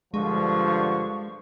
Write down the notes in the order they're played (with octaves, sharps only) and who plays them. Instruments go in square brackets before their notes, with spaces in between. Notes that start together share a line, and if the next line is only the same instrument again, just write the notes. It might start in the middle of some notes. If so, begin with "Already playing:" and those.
[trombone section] G2 D3 F3 [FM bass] G#3 [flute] C#6